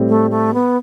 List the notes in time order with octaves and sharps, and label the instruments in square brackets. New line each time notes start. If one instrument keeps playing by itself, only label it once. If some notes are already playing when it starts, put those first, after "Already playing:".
Already playing: [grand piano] A2 G3 C4
[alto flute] A3
A3
B3